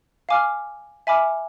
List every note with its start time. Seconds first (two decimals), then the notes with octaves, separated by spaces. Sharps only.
0.29 F5 G#5 D6 F6
1.07 E5 G#5 B5 D6 F6